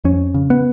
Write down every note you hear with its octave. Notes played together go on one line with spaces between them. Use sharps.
F2 C#4
C#3
B3